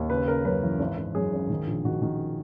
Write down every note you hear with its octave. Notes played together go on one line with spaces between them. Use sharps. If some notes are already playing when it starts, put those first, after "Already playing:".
Already playing: D#2
C#3 B4
C#3 A#4
F#2 B4
E3
G#1
G#1
F#2 G#4
G#1
D#3
A#1
D#3 F#4
D#3